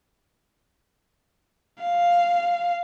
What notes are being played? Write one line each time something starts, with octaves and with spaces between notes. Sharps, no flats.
F5